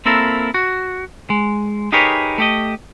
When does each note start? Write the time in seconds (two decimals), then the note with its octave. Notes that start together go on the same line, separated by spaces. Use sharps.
0.05 A#3 C4 E4 A4 A#4
0.54 F#4
1.30 G#3
1.92 D#4 G4 G#4 A#4 B4 C#5
2.38 A3 G4 D#5